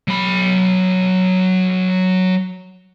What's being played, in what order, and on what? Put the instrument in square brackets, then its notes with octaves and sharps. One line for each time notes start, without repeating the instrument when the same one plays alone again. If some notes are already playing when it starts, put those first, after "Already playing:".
[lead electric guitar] F#3 B5